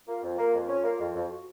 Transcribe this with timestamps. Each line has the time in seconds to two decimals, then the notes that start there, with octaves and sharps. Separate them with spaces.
0.07 A#3 F4
0.23 F2
0.38 A#3
0.54 F2
0.68 C#4
0.84 A#3
0.99 F2
1.15 F2
1.30 F#4